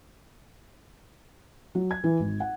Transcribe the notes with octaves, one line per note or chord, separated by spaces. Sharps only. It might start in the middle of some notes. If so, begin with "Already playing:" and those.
F#3
G#6
E3
G#1
F#5